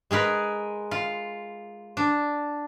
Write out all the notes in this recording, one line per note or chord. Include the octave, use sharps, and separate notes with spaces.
G#3 G#4 A#4 B4
F4
D4